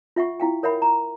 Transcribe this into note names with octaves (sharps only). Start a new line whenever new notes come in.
F4 E5 F#5 C#6
E4 F5 G5
A#4 C#5 E5 F#5 B5
A#5